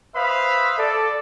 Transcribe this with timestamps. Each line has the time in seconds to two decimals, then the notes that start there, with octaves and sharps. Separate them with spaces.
0.15 B4 C5 E5 F5 B5 D#6
0.78 A4 D5